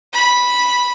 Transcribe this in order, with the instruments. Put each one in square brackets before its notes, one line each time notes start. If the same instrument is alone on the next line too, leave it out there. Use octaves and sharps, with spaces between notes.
[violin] B5